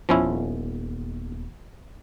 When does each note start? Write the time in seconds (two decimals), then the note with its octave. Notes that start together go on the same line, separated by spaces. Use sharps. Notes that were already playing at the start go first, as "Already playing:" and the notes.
0.09 D#1 F3 B3 C#4 E4